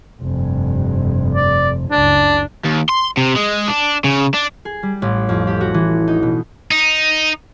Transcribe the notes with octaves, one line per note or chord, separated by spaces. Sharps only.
F1 G2
D5
F#1 C#2 D4
D#2
C6
C3
G#3
D4
C#3
D4
G#4
G3
A1
F2
G4
F#4
E3
D#4
B2
D#4